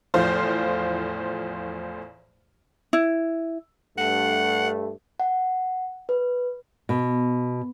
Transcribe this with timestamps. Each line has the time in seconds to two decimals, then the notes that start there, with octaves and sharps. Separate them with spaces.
0.14 E2 A2 F3 C5 F5
2.93 E4
3.98 G2 A3 F#5
5.20 F#5
6.09 B4
6.89 B2